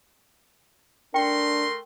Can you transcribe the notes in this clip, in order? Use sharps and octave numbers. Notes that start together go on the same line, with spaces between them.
A3 D4 A#4 G5 C6